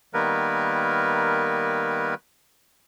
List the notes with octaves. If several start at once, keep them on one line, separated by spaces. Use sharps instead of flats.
D#3 G3 A#3 B3 A#4 B4